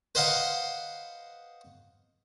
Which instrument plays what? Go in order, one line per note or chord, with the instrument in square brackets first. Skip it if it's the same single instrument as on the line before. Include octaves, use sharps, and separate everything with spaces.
[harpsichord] B4 C5 D#5 F5 F#5 A#5